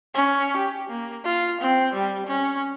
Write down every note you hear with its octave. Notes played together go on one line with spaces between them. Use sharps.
C#4
G4
A#3
F4
C4
G3
C#4